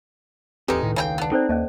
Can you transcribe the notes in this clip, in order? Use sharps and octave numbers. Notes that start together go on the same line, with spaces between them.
D1 E2 G#3 C4 D#4 G4 A4 B4
E1 C#2 A2 D#3
C#3 E4 F5 G5
B3 D4
C4 D#4 A4 C5 D5
D#2 A#3 C#4 D#5 A5